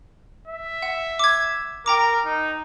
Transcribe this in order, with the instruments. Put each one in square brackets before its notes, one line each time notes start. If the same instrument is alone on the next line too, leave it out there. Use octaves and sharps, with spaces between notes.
[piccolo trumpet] E5
[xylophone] F#5
D6 G#6
[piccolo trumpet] A#4 [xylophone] G5 A#5 D6
[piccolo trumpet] D#4